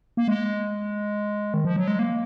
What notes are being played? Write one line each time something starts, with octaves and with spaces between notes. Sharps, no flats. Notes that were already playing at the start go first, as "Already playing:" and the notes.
A#3
G#3
D#3
F3
F#3
G#3
A#3